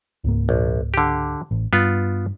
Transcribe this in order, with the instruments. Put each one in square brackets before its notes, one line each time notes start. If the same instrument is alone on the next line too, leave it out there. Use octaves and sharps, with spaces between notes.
[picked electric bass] C#2 G#2 A#3
[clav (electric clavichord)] A#1
D3 G4
[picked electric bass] A1
[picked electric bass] G2 [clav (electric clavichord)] B3 F4